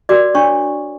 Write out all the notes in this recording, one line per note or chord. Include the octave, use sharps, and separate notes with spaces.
F#4 A#4 D5 D6
D4 C#5 C#6